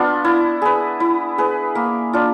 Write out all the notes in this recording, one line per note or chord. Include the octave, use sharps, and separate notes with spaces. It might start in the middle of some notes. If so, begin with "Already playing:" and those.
Already playing: B3 D4 F4
E4
G#4 B4
E4
G#4 B4
A#3
D4 F4